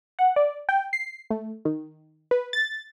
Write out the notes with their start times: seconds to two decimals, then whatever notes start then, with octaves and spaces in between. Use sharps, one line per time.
0.19 F#5
0.36 D5
0.69 G5
0.93 C7
1.31 A3
1.65 D#3
2.31 B4
2.53 A6